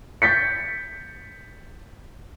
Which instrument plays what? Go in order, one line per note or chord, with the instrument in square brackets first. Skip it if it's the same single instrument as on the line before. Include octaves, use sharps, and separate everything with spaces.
[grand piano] G6 A6 B6 C#7